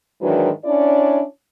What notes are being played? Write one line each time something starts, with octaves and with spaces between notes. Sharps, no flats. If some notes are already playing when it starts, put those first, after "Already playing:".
G#2 D#3 E3 F#3 D4 B4
C#4 D4 E4 C#5 D5